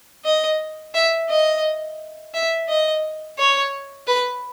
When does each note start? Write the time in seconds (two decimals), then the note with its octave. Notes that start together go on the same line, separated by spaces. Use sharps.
0.25 D#5
0.94 E5
1.29 D#5
2.34 E5
2.69 D#5
3.39 C#5
4.07 B4